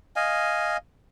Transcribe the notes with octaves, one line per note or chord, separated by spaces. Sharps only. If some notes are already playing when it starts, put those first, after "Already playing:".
D#5 F5 G#5